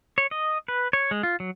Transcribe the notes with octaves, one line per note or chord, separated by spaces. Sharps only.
C#5
D#5
B4
C#5
G#3
F4
F#3